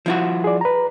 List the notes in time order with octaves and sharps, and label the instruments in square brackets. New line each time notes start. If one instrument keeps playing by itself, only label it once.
[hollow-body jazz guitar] F3 E4 F#4
[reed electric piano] G#4 D5
B4 A#5